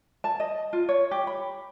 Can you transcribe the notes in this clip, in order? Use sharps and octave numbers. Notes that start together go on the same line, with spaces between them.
A5
D#5
F4
C#5
G4
B5